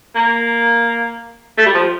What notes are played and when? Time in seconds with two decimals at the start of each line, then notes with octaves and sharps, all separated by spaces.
0.15 A#3
1.58 A3
1.66 G3
1.74 F3